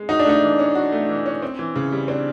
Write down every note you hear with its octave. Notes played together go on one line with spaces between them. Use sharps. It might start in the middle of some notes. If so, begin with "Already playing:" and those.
Already playing: G#3
D#4 F#4
D4
A3 D#4
E3
C#4
F#4
A3
E3
C#4
C4
E3
C#3
G3
C4 D4